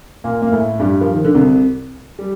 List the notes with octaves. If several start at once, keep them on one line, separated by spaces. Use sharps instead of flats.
A#2 A#3
A#3
A2 A3
G2 G3
F3
D#3
D3
C2 C3
G3